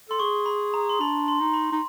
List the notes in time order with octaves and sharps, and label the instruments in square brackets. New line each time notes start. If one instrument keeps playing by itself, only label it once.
[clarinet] A4 [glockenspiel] C6
[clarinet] G#4 [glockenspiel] C#6
[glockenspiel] B5
A#5
C6
[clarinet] D4 [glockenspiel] B5
[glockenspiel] C6
[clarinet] D#4
[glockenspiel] B5
[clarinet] D#4